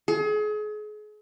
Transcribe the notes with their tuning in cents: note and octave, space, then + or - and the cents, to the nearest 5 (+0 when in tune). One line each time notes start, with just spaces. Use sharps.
G#4 +35